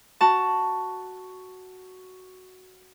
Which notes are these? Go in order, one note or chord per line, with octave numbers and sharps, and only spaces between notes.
F#4 A5